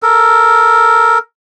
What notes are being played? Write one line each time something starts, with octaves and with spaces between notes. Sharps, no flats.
A4 A#4